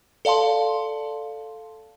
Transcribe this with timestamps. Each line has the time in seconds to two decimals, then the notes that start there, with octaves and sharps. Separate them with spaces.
0.25 A4 D5 F5 A5 C6